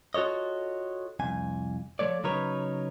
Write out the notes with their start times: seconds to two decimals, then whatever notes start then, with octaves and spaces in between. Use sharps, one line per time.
0.14 F4 F#4 A4 C#5 D#5
1.20 C2 F2 G#5
1.99 F3 A3 C#5 D5
2.24 C#3 F#3 D#4 A#4 B4 C#5